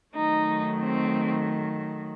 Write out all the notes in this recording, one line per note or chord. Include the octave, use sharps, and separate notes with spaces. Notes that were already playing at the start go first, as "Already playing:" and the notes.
D#3 F#3 A3 D#4
C4